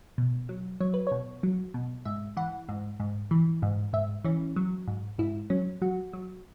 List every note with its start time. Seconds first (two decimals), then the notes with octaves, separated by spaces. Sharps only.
0.18 B2
0.49 F#3
0.80 F#3 C#5
0.94 B4
1.07 B2 C#5
1.43 F#3
1.74 B2
2.05 G#2 E5
2.37 E3 F#5
2.69 G#2
3.00 G#2
3.31 E3
3.62 G#2
3.93 G#2 E5
4.25 E3 C#4
4.56 F#3
4.88 G#2
5.19 G#2 E4
5.50 F#3 C#4
5.82 F#3 F#4
6.13 F#3